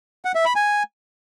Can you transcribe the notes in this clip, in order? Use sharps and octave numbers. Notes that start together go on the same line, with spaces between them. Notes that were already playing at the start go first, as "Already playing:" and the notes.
F#5
E5
B5
G#5